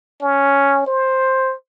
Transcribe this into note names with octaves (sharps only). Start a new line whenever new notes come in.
C#4
C5